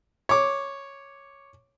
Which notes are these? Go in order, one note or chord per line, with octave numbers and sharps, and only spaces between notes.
C#5 D6